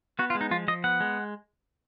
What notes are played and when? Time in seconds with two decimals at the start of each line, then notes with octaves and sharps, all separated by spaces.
0.19 B3 F#4
0.30 F4
0.35 G#3
0.41 D#4
0.51 F3 F4
0.68 F3 D#5
0.84 B3 F#5
1.00 G#3